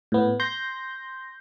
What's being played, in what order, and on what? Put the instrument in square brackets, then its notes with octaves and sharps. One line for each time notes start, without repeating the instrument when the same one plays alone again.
[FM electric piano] A2 B3
C6 G6 A#6